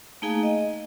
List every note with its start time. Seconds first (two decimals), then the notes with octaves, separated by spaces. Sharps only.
0.22 A3 A#3 D#4 G#4 F5 G#5
0.43 D#5